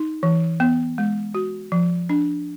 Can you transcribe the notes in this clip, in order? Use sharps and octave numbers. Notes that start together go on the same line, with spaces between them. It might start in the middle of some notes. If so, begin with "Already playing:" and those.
Already playing: D#4
E3
B3
G#3
F#4
F3
D4